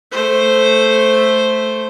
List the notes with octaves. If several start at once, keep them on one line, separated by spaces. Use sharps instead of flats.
A3 C5